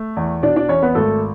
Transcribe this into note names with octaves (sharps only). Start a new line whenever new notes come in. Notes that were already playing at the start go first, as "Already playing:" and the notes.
Already playing: A3
E2
B2 D4 D5
D4 D5
E2 C#4 C#5
B3 B4
G#1 A3 A4